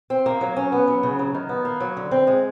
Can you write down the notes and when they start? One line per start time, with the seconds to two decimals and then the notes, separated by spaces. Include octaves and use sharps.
0.10 C4
0.26 A#3
0.41 F#3
0.56 C#4
0.72 B3
0.88 F#3
1.03 C#3
1.19 F#3
1.35 D#3
1.49 B3
1.65 A#3
1.80 F#3
1.97 D3
2.11 C4
2.27 G#3